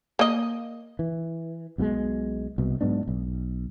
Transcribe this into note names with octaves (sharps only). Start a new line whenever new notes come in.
A#3 D#5
E3
B1 B2 D3 G#3
C2 B2
G#2 F#3 B3 D4
B1